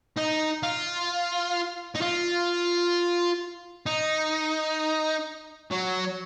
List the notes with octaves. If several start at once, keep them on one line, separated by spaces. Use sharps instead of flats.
D#4
F4
D#4
F4
D#4
F#3